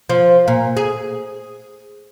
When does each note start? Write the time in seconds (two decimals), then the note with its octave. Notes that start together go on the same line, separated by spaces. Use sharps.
0.09 F3
0.48 A#2
0.77 G#4